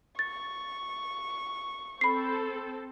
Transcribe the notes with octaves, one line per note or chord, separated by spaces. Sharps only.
C#6 A6
C4 A4 B5 C7